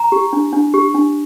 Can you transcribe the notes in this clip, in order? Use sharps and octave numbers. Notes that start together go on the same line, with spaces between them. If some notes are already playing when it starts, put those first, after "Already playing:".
Already playing: A#5
G4
D4
D4
G4
D4